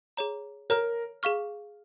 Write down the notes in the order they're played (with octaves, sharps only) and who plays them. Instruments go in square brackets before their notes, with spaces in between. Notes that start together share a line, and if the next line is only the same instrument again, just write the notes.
[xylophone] G#4 C#5 A#5
[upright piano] A#4 [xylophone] C#5 A#5 F6
[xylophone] G#4 F5 C#6 F6